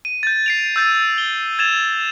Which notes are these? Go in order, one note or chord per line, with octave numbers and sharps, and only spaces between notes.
D#7
G6 A6
C7 D7 F7
E6 G6 A6 D#7
G7
G#6 A6 E7 F7